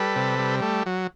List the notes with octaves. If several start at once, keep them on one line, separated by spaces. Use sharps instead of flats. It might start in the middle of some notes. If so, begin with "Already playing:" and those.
Already playing: G3 A4 B4
C3
G3
A3
F#3